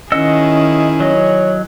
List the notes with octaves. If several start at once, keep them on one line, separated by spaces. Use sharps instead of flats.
D#3 C#4 E4 G#4 D#5 F#5 E6
F#3 C#5 D#5